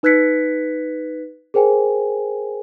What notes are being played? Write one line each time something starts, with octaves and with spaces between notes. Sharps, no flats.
D#4 B4 F#6 G#6 B6 C#7
G#4 A#4 C5 G5 G#5